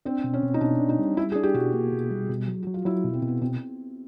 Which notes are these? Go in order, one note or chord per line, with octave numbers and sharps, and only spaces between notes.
C4 D4
B2
C#4
B2
D#4
B2 D4
D4
D#4
G3
G3 E4
D4 G#4
G4
B2 F#4
A#3
B2
G3
B2
F#3
F#3 F#4
F4
F#3 E4
B2
C4
B2
B3
B2 C4